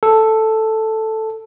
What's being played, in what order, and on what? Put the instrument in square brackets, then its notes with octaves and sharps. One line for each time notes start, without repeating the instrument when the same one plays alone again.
[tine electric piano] A4